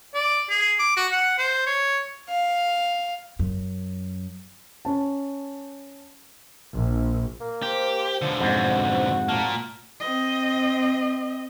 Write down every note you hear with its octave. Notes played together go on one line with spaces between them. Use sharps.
D5
G#4
D6
F#4
F#5
C5
C#5
F5
F#2
C#4 A5
A#1
A#3
G4 C5
B1 D3 F3
F2 G#2 F#4
A#2 A#3 A5
C4 D#5